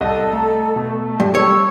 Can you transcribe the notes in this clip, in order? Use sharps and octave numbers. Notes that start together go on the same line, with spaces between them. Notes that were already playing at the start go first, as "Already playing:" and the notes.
C2 A4 D#5
A3 A#5
B2
G2
G3 A4 C#5 E6